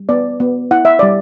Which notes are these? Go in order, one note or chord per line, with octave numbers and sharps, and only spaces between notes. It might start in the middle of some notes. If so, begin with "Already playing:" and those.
Already playing: G3
B3 D5
B3
E4 F#5
E5
G3 D5